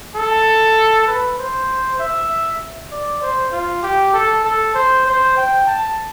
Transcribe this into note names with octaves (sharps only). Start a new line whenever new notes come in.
A4
B4
C5
E5
D5
C5
F4
G4
A4
A4
C5
C5
G5
A5